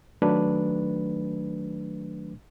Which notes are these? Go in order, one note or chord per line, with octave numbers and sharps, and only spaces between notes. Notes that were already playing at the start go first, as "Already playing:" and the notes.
D#3 F#3 A3 D4 B4